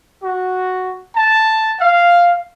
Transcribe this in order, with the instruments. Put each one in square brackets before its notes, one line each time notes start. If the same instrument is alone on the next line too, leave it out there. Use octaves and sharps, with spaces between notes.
[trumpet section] F#4
A5
F5